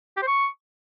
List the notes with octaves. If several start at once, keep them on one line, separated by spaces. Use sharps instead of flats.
G4
C5
C#6